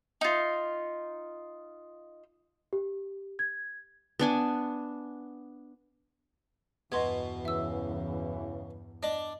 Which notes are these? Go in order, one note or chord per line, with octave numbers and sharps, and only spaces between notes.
D#4 F4
G4
G#6
B3 D4 G#5
E2 G2 B2 D#5 C6 G#6
C#3 E3 E5 E6
D4 D#5